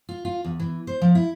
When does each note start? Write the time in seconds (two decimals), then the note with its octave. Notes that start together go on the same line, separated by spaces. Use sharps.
0.09 F4
0.25 F4
0.44 E2
0.60 E3
0.87 C5
1.02 F3
1.15 E4